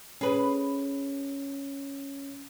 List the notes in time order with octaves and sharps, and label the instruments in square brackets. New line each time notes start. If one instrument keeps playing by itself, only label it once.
[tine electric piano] C#4 [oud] G#4 B4